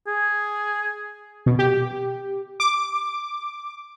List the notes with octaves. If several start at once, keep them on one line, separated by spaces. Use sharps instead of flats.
G#4
B2
G4
D6